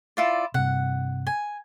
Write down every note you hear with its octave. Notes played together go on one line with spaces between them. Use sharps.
E4 F4 D5
G2 C3 F#5
G#5